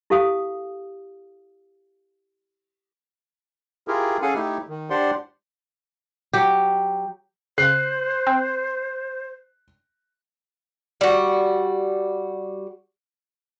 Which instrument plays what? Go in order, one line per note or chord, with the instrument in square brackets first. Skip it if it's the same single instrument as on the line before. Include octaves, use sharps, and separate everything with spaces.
[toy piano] E4 G4 A4 F5 D#6
[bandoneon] E4 F4 G4 G#4 A#4
C#4 G#4 A4 F5 F#5 G#5
A3 D#4 E4 G4
D#3
D4 G4 C5 D5 F#5 C6
[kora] F#3 G4
[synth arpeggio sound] C#3 [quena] C5 [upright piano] F#6 C7
[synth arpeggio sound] C4
[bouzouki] G3 F#4